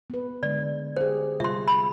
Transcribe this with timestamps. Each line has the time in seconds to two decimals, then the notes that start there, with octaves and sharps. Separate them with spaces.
0.10 B3 B4
0.43 D3 G#3 D5
0.97 G4 G#4 C5
1.40 C3 G3 F4 E5 C6
1.68 B5